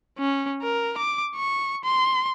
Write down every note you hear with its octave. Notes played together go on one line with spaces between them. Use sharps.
C#4
A#4
D6
C#6
C6